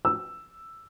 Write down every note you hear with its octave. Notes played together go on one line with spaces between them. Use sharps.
E6